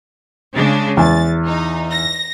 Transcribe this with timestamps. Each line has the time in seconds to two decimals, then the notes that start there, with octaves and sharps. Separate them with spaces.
0.53 C#3 G#3 D4
0.97 E2 G#5 A6
1.45 D#4
1.91 A#6